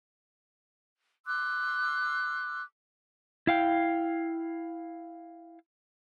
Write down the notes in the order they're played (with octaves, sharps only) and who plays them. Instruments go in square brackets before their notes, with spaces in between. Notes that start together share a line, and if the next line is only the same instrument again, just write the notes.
[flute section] C6 D6 E6 F#6
[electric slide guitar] E4 F5 G5